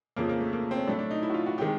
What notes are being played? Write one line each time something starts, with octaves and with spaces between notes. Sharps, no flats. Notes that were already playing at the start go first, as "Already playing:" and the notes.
F2 C#3 F3 A#3
A#3
A3
A#3
C4
C#4
A2 F#3 A3 D4
D4
D#4
E4
F#4
F4
F#4
C3 D#3 G#3 G4